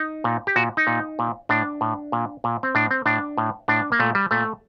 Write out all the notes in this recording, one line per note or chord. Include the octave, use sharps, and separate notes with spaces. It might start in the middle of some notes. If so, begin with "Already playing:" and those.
Already playing: D#4
A#2
G4
A#2 F#4
D#4
A#2
A#2
A2 D4
A2
A#2
A#2
C4
A2 D4
C4
A2 D4
A2
A2 D4
A#3
A#2 A3
G3
A#2 A3